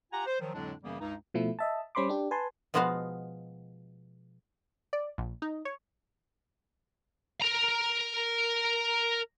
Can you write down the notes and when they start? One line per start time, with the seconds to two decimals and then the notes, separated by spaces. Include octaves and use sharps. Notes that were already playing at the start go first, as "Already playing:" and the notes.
0.12 F4 G4 F#5 G#5 A#5
0.26 C5
0.40 D#3 F3 F#3
0.54 F2 A2 D3 F#3 G#3 D4
0.84 F#2 C#3 E3 G3 A#3 B3
1.00 C#2 G2 D#4
1.34 B2 F3 A3 E4
1.59 D#5 E5 A5
1.95 G3 C#4 C5 B5 C6 D6
2.09 D4 G4
2.31 B4 G#5 A5 C6
2.74 B2 F3 G#3 B3 F#4 F5
4.93 D5
5.18 A#1
5.42 D#4
5.65 C#5
7.42 A#4 A#5